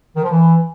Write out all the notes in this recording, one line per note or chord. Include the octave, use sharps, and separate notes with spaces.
D#3
F3
E3